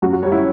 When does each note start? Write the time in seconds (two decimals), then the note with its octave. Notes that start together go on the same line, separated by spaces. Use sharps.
0.02 F#2 F#4
0.13 F#4
0.23 G3 C#5
0.32 E4